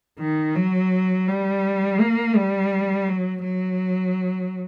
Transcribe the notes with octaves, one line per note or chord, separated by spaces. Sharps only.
D#3
F#3
G3
A#3
G3
F#3
F#3